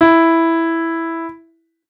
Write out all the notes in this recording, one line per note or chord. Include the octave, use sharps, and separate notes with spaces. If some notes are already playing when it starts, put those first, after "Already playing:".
E4